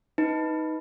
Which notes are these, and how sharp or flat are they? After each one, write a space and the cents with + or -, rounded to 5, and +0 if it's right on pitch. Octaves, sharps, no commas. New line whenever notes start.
D#4 +15 B4 +0